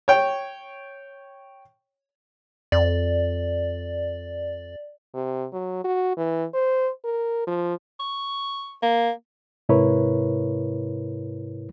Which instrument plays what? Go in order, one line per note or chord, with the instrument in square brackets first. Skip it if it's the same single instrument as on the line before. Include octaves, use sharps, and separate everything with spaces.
[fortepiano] C#5 G5
[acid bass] F2 [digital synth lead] D5
[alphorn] C3
F#3
F#4
E3
C5
A#4
F3
[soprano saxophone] C#6
A#3
[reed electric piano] G#2 C3 E4 A#4 B4 C#5